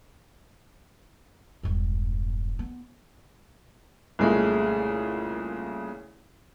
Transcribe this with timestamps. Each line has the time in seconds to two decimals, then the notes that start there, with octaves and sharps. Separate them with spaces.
1.63 E1 G2
2.59 B3
4.19 C2 A#2 C#3 G#3 A3